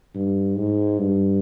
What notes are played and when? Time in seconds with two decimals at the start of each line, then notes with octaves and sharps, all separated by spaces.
0.15 G2
0.56 G#2
0.99 G2